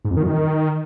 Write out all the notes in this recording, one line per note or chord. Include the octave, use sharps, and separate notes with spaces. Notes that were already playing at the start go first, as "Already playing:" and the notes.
G#2
F2
D#3
F#2
D#3